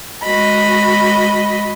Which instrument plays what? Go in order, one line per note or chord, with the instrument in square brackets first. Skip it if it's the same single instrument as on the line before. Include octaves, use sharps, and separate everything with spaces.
[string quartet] G#3 F#4 D#5 B5